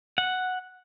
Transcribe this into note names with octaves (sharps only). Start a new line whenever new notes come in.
F#5